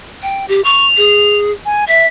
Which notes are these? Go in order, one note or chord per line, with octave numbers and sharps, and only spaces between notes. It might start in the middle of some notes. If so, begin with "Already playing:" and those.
G5
G4
C#6 F7
G#4
G#5
E5 B6